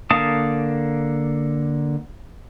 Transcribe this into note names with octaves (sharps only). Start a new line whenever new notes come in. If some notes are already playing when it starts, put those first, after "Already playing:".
D3 A#3 F5 A5 D#6